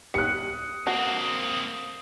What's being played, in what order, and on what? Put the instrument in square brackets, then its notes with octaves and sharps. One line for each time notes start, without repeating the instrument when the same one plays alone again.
[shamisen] G3 [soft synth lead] D#6 [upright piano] F#6 C#7
[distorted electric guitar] A#3 C4 [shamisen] D4 F#4